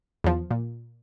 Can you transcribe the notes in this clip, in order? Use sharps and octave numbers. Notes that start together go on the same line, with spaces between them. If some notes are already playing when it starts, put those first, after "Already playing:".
E2 F3
A#2